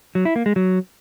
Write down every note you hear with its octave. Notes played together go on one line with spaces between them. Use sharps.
F#3
E4
A#3
G#3
F#3